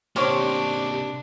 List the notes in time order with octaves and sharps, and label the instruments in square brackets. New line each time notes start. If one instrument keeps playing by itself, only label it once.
[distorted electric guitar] C3 A#3 [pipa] C#4 C5 C#5 [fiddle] D4 [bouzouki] G4